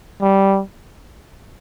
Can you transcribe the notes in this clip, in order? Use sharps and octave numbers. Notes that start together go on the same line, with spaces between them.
G3